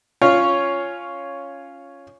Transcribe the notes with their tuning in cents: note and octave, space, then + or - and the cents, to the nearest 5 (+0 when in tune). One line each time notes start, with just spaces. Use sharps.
C#4 +0 F4 -5 C#5 +5